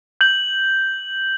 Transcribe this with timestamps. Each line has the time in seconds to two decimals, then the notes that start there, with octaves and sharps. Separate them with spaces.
0.21 G6 F#7